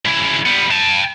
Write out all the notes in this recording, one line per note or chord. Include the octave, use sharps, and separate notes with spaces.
C#3 E4
G3 B3
G5 A5